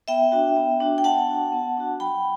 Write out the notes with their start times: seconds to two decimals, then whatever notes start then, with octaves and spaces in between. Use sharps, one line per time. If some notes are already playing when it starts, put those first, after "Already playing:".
0.08 B3 E5 G5
0.32 D4 F#4
0.56 B3
0.80 D4 F#4
0.98 G5
1.04 B3 F#5 A5
1.29 D4 F#4
1.52 B3
1.77 D4 F#4
2.00 F#3 G5 B5